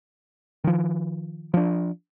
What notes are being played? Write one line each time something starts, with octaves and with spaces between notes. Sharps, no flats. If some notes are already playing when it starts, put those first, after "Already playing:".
D#3 F3
F3 D4